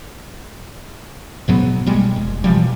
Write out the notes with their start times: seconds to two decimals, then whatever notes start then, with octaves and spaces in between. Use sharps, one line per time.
1.48 B1 G#2 F#3 B3
1.86 B1 G3 G#3
2.16 F1
2.44 B2 E3 F3 G3